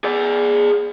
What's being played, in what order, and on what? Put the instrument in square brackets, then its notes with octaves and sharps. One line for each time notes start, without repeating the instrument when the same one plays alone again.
[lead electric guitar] G#4 D5